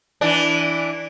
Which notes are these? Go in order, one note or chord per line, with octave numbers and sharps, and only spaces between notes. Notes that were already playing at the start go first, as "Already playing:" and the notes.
E3 D4